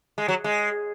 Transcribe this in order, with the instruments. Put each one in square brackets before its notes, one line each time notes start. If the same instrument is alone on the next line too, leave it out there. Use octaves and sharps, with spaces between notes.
[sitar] G#3
F#3
G#3